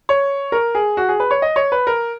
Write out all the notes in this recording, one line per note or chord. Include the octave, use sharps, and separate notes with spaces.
C#5
A#4
G#4
F#4
G#4
B4
C#5
D#5
C#5
B4
A#4